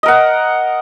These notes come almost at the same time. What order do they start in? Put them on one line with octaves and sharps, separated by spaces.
D#5 A#4 F#5